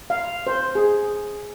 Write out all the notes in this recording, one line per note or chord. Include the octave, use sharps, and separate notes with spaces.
F5
C5
G#4